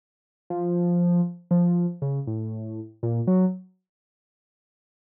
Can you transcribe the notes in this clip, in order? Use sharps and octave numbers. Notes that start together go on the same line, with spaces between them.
F3
F3
C#3
A2
A#2
F#3